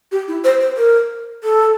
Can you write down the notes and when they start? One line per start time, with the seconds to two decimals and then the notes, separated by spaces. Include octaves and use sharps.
0.12 G4
0.28 E4
0.44 C5
0.61 C5
0.77 A#4
1.44 A4